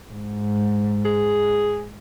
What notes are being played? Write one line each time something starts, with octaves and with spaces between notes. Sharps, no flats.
G#2
G#4